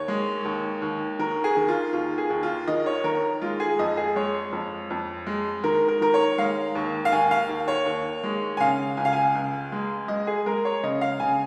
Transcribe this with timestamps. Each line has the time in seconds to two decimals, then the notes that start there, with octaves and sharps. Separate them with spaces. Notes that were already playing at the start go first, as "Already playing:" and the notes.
Already playing: D#2 C#5
0.08 G#3
0.45 D#2
0.82 D#2
1.19 D#3 A#4
1.44 G#4
1.56 D#3
1.68 F4
1.93 D#2 F4
2.18 G#4
2.30 D#2
2.43 F4
2.67 D#3 D#5
2.86 C#5
3.04 D#3 A#4
3.42 G#3 F4
3.60 G#4
3.79 F2 D#5
3.97 G#4
4.16 G#3 C#5
4.52 F2
4.90 F2
5.27 G#3
5.64 D#3 A#4
5.88 A#4
6.01 D#3 A#4
6.14 C#5
6.38 G#3 F5
6.75 D#2
7.05 F5
7.12 D#2 G#5
7.31 F5
7.49 D#2
7.68 C#5
7.86 D#2
8.24 G#3
8.57 G#5
8.60 C#3 F5
8.97 C#2 G#5
9.05 F5
9.13 G#5
9.35 C#2
9.72 G#3
10.08 G#3 D#5
10.27 G#4
10.46 G#3 A#4
10.65 C#5
10.83 C#3 D#5
11.01 F5
11.20 C#3 G#5